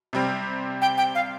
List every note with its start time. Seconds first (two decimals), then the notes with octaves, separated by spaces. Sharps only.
0.13 C3 G3 C4
0.81 G5
0.97 G5
1.15 F5